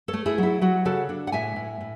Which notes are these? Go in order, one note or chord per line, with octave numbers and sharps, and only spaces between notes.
A4 C#5
A3
E4 G#4
F#3 E4
F#3 F#4
C#3 F#4 A4
D4
F#5
A2 E5 G#5
A2
A2